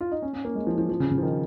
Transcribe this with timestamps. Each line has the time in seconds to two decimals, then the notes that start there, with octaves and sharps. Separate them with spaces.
0.01 F4
0.11 D#4
0.22 C#4
0.33 C#4
0.45 A#3
0.55 G#3
0.67 F3
0.78 F3
0.89 F3
1.00 C#3
1.11 C#3
1.18 F3
1.23 D#3